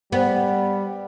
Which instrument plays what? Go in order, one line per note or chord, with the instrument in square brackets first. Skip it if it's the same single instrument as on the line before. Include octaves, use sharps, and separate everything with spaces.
[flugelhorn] G3 [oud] B3